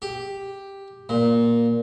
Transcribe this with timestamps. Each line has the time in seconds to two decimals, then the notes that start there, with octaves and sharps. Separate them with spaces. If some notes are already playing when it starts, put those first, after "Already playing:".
0.02 G4
1.09 A#2